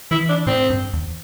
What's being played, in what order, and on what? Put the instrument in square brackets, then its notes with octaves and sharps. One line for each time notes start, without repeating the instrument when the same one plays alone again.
[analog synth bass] E3 [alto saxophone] E4
[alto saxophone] D4
[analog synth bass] A2 [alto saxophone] C4
[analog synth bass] G2
E2